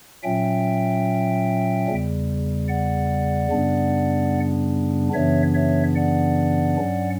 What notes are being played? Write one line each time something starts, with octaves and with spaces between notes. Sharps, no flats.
A#2 F#3 C#4 E5 G5
E2 C#3 G3
D5 F#5
F#2 C#3 G3 B3 D4
F#2 C#3 E3 B3 D4 C#5 E5
C#5 E5
D5 F#5
G2 F#3 C#4